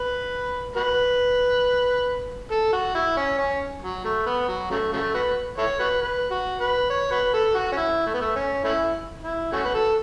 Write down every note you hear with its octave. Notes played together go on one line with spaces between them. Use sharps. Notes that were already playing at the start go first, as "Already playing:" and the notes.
Already playing: B4
F#4 B4
A4
F#4
E4
C#4
C#4
F#3
A3
B3
F#3
C#3 F#3 A3
C#3 F#3 A3
F#4 B4
E4 A4 C#5
F#4 B4
B4
F#4
B4
C#5
F#4 B4
A4
F#4
C#4
E4
A3
B3
A3
C#4
A3 C#4 E4
E4
A3 C#4 F#4
B4
A4